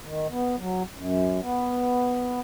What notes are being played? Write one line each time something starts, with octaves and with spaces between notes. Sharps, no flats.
D#3
B3
F#3
F#2
B3